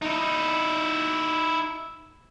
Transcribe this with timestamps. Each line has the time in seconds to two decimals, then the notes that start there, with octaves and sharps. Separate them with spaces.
0.02 D#4 E4